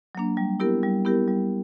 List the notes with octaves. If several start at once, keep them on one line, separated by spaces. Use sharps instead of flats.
F#3 A#3 D4
G3
B3 E4 G4 A#4
G3
B3 E4 G4 A#4
G3